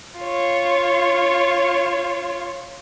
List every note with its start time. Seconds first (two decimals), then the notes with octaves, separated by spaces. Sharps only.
0.19 F4 C#5